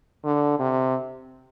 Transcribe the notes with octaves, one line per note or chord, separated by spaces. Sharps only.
D3
C3